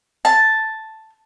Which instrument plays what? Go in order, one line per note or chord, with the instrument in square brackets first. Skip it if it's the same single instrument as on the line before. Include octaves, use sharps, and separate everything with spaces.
[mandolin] A5